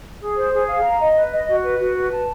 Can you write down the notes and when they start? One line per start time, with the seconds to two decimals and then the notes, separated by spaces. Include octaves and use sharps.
0.20 G#4
0.36 C5
0.52 G#4
0.67 F5
0.84 A#5
0.99 D#5
1.16 B4
1.32 D#5
1.48 F#4
1.63 B4
1.79 F#4
1.96 B4
2.11 A5